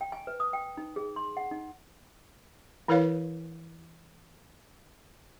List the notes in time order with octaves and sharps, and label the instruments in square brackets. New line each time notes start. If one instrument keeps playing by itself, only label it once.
[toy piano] G5
G#5
B4
D#6
G5
D#4
G#4
C6
F#5
D#4
[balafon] E3 E4 A#4 B4 C#5 F5